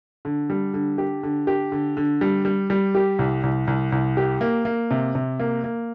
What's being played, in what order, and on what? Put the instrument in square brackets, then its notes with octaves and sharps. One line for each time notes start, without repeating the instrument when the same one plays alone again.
[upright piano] D3
G3
D3
G4
D3
G4
D3
D3
G3
G3
G3
G4
C2
C2
C2
C2
G4
A#3
A#3
C3
C3
A#3
A#3